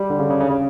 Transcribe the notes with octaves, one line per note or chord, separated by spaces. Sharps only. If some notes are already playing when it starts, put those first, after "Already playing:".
Already playing: G3
D3
C#3
C#3
C#3
C#3